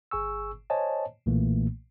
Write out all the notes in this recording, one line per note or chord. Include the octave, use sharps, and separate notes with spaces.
G1 G#4 G#5 C#6 E6
C5 C#5 D#5 G#5 A5
B1 A#2 E3 A3 A#3